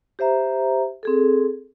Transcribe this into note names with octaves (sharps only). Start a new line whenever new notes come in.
G4 C5 E5 A#5
C4 G#4 A4